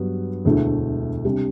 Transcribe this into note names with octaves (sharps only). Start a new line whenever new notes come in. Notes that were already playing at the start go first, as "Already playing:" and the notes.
Already playing: G2 F#3 B3
E1 D2 D3 A3 E4
C3 G3 D4 G4